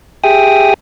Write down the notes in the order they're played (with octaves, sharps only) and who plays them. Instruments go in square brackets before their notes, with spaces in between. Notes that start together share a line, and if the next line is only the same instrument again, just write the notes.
[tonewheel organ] G4 G#4 E5 G5 D#6